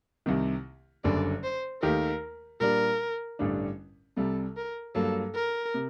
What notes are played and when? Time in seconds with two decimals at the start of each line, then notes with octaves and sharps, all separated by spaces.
0.26 C2 C3 D#3
1.04 F#1 F#2 D3 G3 D5
1.43 C5
1.82 D#2 D#3 A3 D#4 G4 A#4
2.60 A#2 G3 D4 A#4
3.39 A1 G2 D3 G3 D4
4.17 C2 C3 G3 A4
4.57 A#4
4.95 G2 F#3 A#3 A4
5.34 A#4
5.74 C3